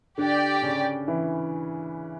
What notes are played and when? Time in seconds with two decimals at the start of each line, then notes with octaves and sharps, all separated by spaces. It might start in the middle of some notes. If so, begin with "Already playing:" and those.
0.18 D3 D4 G4 D5 G5
0.62 C#3 C#4
1.08 E3 E4